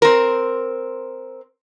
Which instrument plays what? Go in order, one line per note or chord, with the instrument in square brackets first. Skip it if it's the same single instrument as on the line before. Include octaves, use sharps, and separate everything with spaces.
[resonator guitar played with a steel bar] C4 A#4